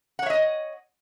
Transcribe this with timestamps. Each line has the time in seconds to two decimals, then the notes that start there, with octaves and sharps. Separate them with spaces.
0.19 F#5
0.23 C#5
0.26 E5
0.30 D#5